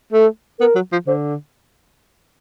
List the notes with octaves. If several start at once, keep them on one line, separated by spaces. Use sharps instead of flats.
A3 A4
B3 A#4
F#3
F3
D3 C5